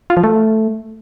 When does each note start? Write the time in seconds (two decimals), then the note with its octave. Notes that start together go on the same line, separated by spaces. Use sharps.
0.10 F4
0.17 F3
0.24 A3